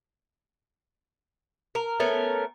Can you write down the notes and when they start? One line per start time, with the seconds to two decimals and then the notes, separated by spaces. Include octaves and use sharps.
1.75 A#4
2.00 A3 B3 C#4 A#4